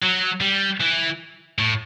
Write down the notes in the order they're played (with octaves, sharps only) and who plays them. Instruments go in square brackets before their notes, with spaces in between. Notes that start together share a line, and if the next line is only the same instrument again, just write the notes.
[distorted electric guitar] F#3
G3
E3
A2